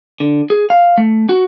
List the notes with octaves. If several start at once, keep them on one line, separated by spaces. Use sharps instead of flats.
D3
G#4
F5
A3
F#4